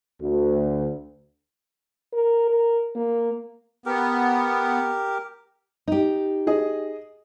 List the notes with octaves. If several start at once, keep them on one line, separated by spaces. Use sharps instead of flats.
D2
A#4
A#4
A#3
B3 G4 A#4
D#4 G4
G#4 D#5